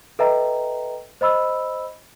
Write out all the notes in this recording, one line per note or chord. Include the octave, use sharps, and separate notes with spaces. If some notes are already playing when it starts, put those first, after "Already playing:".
A4 B4 D#5 E5 G5 A#5
C5 D#5 B5 E6